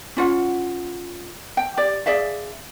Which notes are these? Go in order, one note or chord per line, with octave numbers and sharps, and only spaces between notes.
C#4 F4 F#5
G5
G4 D5
G#4 D5 E5 F5